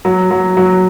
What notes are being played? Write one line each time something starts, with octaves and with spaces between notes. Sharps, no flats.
F#3
F#3
F#3